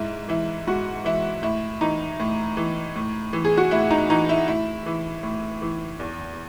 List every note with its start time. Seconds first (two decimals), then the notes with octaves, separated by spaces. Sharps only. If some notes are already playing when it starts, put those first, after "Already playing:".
Already playing: G#2 E4
0.29 E3 E4
0.67 G#2 F#4
1.05 E3 E4
1.43 A2 E4
1.81 E3 D#4
2.20 A2
2.57 E3
2.96 A2
3.33 E3
3.45 G#4
3.57 F#4
3.71 A2 E4
3.91 D#4
4.10 E3 D#4
4.29 E4
4.48 A2 E4
4.86 E3
5.23 A2
5.62 E3
6.00 E2